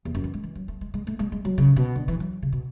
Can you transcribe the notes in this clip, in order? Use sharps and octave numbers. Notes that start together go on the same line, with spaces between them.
E2
F#2
E3
G#3
E3
F#3
A3
G#3
G#3
A3
G#3
G#3
F#3
C#3
B2
D3
E3
F#3
C#3
B2